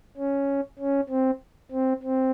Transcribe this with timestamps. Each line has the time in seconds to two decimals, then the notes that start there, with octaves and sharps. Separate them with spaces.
0.17 C#4
0.79 C#4
1.09 C4
1.71 C4
2.03 C4